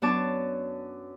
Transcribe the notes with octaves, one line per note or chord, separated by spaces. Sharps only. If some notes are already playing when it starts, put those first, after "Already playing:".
F#2 B3 D4 C#5 A5 D6